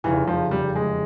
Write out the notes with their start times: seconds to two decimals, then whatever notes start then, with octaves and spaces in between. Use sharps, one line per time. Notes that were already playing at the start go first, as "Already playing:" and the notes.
0.04 F1 E2 C#3 E3
0.27 F3
0.51 G3
0.76 G#3